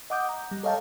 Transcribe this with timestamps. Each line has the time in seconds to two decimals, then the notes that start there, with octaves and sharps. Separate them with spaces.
0.10 D#5 F#5 D6 D#6 G6
0.29 A#5
0.51 G3
0.63 A4 C#5 D#5 F5 G5 A5